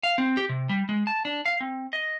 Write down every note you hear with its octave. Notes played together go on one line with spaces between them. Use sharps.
F5
C4
G4
C3
G3
G#3
A5
D4
F5
C4
D#5